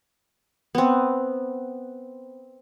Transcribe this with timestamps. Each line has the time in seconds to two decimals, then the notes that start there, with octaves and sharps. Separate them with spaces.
0.75 B3 C4